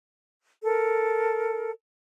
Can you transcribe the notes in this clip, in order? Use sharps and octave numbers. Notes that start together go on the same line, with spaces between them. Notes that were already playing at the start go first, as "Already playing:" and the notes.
A4 A#4